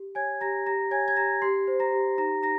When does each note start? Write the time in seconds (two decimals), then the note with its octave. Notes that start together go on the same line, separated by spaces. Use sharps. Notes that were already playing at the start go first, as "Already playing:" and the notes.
Already playing: G4
0.15 C#5 G#5 G#6
0.41 G4 A#5 A#6
0.66 G4 A#5 A#6
0.91 C#5 G#5 G#6
1.08 G#6
1.16 G4 A#5 A#6
1.42 G4 C6 C7
1.67 C5
1.80 A#5 A#6
1.92 G4
2.18 D#4 A#5 A#6
2.43 D#4 A#5 A#6